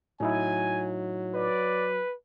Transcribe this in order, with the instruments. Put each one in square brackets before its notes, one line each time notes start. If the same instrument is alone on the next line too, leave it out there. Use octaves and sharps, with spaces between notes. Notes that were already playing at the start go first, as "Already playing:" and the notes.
[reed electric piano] A2 D#4 E4 [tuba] F#3 [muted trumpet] G#5
[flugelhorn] B4 [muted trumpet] D5